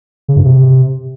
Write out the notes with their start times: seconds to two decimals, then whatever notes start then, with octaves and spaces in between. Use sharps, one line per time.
0.28 C#3
0.37 G2
0.45 C3